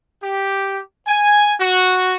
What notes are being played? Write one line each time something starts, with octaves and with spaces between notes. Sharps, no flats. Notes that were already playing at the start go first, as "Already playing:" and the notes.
G4
G#5
F#4